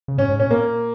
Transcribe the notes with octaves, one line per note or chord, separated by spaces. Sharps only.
C#3
G#2 C#4
G#2
A#2 C#4
A#2 A#3